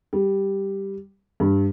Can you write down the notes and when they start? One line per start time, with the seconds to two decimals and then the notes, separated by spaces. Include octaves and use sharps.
0.13 G3
1.40 G2